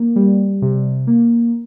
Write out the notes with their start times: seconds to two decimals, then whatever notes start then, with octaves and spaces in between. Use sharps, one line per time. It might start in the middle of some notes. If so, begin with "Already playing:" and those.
Already playing: A#3
0.16 G3
0.62 C3
1.07 A#3